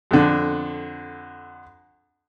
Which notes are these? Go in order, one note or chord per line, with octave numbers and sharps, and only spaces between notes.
F2 D3